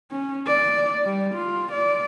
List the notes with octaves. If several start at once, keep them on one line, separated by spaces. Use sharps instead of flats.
C#4
D5
G3
F4
D5